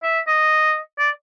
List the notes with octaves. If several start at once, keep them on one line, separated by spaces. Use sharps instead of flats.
E5
D#5
D5